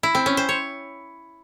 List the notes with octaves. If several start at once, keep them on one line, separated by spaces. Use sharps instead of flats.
E4
C4
C#4
C5
C#5